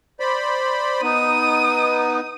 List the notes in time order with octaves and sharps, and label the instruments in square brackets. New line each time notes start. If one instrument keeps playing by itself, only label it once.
[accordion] C5 D5 B5
[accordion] B3 D#4 [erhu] D#6